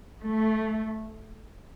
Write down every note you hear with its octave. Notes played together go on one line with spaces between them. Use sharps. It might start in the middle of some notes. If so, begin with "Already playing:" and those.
A3